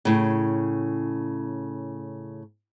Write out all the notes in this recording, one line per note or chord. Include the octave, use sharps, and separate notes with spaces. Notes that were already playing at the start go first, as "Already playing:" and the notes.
A2 C#3